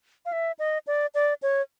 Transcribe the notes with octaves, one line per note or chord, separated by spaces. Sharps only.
F5
E5
D#5
D5
D5
C#5